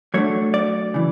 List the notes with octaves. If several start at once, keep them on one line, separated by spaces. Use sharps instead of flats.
F#3 A3 D4 C#5
D5
C#3 E3